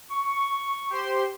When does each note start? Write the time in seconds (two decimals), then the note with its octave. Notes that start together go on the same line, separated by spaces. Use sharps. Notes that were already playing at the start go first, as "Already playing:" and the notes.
0.11 C#6
0.90 G4 C5 C6